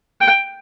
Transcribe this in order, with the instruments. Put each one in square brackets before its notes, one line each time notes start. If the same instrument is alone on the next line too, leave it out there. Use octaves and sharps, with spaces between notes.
[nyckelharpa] G5